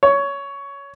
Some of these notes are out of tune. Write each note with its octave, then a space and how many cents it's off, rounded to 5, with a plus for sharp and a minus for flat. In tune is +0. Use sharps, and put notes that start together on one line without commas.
C#5 +15